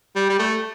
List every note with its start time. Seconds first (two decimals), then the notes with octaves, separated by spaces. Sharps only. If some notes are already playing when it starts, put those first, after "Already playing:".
0.16 G3
0.29 G3
0.39 A3